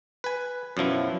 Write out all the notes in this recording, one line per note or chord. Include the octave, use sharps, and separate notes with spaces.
B4 G#5
F#2 B2 F3 E4